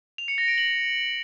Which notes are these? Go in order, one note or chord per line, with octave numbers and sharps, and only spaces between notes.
F7
C#7
A#6
D7
F#7